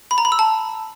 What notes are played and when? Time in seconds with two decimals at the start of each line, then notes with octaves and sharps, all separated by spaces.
0.11 B5
0.18 A#5
0.25 B5
0.32 E6
0.39 A5